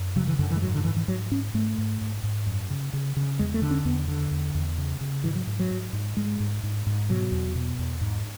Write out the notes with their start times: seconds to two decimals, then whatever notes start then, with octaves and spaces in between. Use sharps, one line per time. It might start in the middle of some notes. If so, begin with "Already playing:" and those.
Already playing: F#2
0.16 C#3 F#3
0.28 E3
0.39 F#2 D3
0.51 E3
0.56 G#3
0.62 G#2 F#3
0.74 D3
0.85 G#2 E3
0.97 E3
1.08 G#2 F#3
1.31 G#2 C#4
1.54 G#2 A3
1.78 G#2
2.01 G#2
2.24 G#2
2.46 F#2
2.70 C#3
2.93 C#3
3.17 C#3
3.39 E2 G#3
3.54 A3
3.62 D3
3.71 C#4
3.85 E2 B3
4.08 D3
4.31 E2
4.55 E2
4.78 C#3
5.01 C#3
5.24 G#2 E3
5.35 F#3
5.47 G#2
5.60 F#3
5.71 G#2
5.93 G#2
6.17 G#2 G#3
6.40 G#2
6.63 G#2
6.87 G#2
7.09 B2 F#3
7.32 E2
7.55 B2
7.79 E2
8.01 G#2